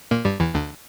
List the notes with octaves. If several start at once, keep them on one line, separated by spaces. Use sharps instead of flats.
A#2 A#3
G2 G3
E2 E3
D2 D3